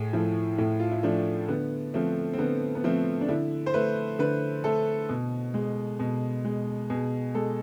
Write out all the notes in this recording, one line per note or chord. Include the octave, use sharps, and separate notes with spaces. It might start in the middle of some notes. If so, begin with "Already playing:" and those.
Already playing: A2 G#4
F3 A3 E4
A2 E4
F4
E4
F3 A3 D4
D3 B3
F3 A3 C4
C4
D3 B3
B3
F3 A3 C4
D4
D3 E4
C5
A3 B4
D3 B4
A3 A4
B2
G#3
B2
G#3
B2 G#4
G#3 A4